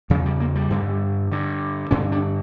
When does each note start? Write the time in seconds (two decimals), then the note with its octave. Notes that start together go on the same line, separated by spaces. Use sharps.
0.10 E2 C#3 F3
0.26 G3
0.40 A#3
0.55 G3
0.71 G2 D3
1.32 G2 D3
1.91 G2 D3 C#4
2.12 D4